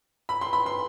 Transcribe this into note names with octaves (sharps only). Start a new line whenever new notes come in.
B5
C6
B5
C6